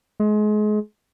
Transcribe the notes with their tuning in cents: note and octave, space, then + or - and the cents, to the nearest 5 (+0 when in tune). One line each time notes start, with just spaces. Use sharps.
G#3 +30